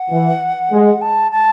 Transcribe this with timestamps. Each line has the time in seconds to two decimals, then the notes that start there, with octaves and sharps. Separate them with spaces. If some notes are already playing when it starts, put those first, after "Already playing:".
Already playing: F#5
0.10 E3
0.71 G#3
1.01 A5
1.32 A5